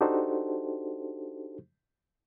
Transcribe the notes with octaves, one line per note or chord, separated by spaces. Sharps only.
D4 D#4 F#4 G4 A4 C5